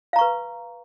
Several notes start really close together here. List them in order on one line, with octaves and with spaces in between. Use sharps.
F5 A#5 C#6 B4